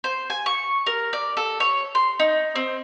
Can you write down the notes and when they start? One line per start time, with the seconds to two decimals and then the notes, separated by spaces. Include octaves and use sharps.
0.04 C5
0.30 G#5
0.46 C#6
0.86 A#4
1.13 D5
1.37 A4
1.60 C#5
1.95 C6
2.19 D#4
2.56 C4